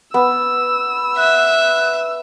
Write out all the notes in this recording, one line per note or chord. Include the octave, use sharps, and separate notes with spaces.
B3 E6
E5 F#6